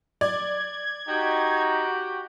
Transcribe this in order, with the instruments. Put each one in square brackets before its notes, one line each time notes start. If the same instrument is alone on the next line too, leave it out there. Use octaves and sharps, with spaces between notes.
[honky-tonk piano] D5 [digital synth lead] G#6
[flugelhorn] D#4 [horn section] F#4 G4